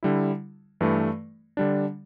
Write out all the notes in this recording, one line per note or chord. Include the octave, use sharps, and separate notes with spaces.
D3 G3 E4
G2 E3 A3
D3 G3 D4